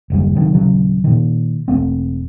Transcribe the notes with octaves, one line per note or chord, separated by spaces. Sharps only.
F#1 D#2 G3
C3 D#3 F#3
D#1 C#3 F#3
A#2 D#3
E1 A3 C4